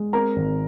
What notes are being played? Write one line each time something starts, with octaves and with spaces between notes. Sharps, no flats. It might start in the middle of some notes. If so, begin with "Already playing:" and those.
Already playing: G#3
C4 A#4 A#5
G#1